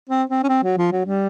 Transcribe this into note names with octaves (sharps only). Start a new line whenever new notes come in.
C4
C4
C#4
C4
F#3
F3
F#3
G3